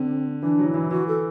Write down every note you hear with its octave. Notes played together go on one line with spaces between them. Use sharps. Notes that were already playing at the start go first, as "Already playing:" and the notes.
Already playing: D3 C4
E3 D4
F#3
E4
E3
E3 F#4
A4